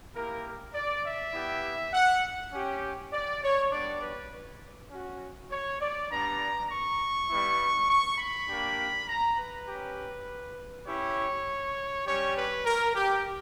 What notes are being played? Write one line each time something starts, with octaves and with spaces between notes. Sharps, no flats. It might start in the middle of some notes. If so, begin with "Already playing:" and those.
A#3 E4 G4 A#4
D5
E5
B3 E4 G4
F#5
C#4 G4
D5
C#5
G3 B3 D4 D5
B4
C#4 F#4
C#5
D5
G3 B3 D4 A#5
C#6
G3 B3 E4
C#6
B5
A#3 D4 G4
A#5
B4
C#4 G4
C#4 E4 G4 C#5
G3 C#4 G4 C#5
B4
A#4
G4